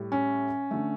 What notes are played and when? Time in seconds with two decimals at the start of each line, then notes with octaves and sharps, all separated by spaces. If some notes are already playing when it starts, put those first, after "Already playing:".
Already playing: A2 G3
0.12 C#4
0.71 D3 A3